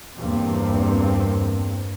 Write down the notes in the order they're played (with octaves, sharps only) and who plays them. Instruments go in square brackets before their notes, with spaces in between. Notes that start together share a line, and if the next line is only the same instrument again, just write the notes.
[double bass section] E2 G2 A#3 C4